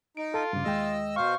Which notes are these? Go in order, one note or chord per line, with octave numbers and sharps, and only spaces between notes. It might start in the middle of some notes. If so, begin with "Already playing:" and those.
D#4 D7
F4 A4 A5
G2 C#3 A#3
D#2 G#3 D#5 G5 E6
B2 C5 F5 C#6